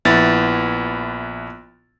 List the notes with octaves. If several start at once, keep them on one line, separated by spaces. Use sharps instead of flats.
A#1 B3 E4 A6